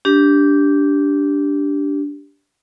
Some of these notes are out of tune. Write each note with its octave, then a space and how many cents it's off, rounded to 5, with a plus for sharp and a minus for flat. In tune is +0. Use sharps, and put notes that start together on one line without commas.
D4 -15 G4 +0